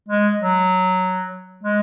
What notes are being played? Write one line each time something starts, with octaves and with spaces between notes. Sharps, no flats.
G#3
F#3
G#3